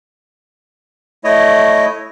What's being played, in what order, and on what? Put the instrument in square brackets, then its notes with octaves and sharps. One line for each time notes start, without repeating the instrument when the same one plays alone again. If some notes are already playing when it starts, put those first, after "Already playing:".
[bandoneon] A3 E4 C#5 D#5